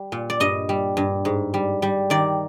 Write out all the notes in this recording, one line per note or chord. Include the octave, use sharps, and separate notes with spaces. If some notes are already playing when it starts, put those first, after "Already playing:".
Already playing: G3
A#2
D5
G2 D#5
G3
G2
G#2
G3
G3
D#3 D5